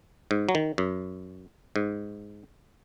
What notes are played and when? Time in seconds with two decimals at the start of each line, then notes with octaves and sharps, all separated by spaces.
0.31 G#2
0.49 F#3
0.55 D#3
0.78 F#2
1.76 G#2